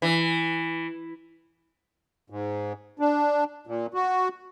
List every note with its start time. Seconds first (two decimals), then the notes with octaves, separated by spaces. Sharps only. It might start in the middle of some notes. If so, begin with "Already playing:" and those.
0.02 E3
2.30 G#2
2.99 D4
3.67 A#2
3.94 F#4